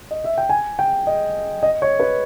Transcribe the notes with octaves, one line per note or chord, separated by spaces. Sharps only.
D#5
E5
G5
G#5
G5
D#5
D#5
C#5
B4